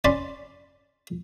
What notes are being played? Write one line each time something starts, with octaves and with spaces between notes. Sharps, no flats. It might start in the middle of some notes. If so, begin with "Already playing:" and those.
C#4 D5 B5 C6